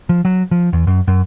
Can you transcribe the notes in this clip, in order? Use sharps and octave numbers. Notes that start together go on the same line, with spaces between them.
F3
F#3
F3
E2
F#2
F#2